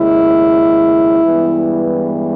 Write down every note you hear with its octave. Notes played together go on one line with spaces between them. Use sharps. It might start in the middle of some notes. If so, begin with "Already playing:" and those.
Already playing: D#2 C#3 G#3 E4
G2 E3 G#3 B3